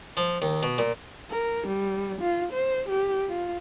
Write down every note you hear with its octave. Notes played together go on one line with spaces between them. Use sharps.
F3
D#2
B2
A#2
A#4
G3
F4
C5
G4
F4